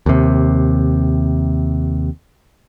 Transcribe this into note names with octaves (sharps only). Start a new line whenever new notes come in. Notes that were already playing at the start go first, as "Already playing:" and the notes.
D#2 C3